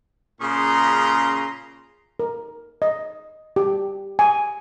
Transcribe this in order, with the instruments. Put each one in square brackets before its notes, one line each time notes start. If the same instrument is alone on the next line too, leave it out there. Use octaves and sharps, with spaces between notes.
[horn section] A#2 C#3 C#4 G#4 A#5 C6
[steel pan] A#4
D#5
G4
G#5